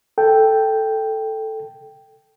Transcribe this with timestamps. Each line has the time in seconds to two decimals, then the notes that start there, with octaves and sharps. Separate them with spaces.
0.18 A4 G5